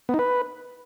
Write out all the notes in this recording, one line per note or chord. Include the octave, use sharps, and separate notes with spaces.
B3
D#4
B4